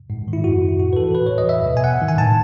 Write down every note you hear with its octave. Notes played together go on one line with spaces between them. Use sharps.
G#2
D#3
E4
F#2 F#4
D#3
E4
A2 F#4
B4
E3 A4
A2 B4
C#5
E3
D#5
E2 E5
B2
G#5
G#2 F#5
D#3
G#5
A2 A5